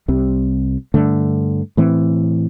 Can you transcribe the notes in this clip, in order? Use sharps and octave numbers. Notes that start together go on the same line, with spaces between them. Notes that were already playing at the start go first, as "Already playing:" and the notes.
C2 C3 G3
G2 D3 A3
A2 E3 C4